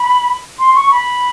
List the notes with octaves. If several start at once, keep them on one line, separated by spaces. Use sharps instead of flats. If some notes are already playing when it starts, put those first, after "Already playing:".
Already playing: B5
C6
C#6
B5